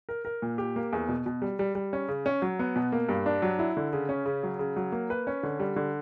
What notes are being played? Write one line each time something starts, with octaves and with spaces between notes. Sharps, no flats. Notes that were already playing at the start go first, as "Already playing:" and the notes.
A#4
A#4
A#2
G4
A#3
E2
B2
B2
G3
G3
G3
C#4
C#3
C#4
F#3
B3
B2
A#3
G2
D4
F#3
E4
D3
C#3
C#4
C#3
F#3
C#3
F#3
A#3
B4
C#4
D3
G3
D3